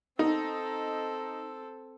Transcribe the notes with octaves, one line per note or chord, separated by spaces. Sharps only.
C4 D#4 A4